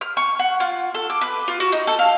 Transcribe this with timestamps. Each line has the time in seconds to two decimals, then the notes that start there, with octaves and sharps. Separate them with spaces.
0.01 F6
0.17 C#6
0.39 F#5
0.60 F4
0.94 A4
1.10 D6
1.21 B4
1.48 F4
1.60 F#4
1.72 D#4
1.87 A4
1.99 F5